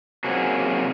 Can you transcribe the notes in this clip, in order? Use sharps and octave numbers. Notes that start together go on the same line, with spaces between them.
C3 F#3 A#3 F#4 G#4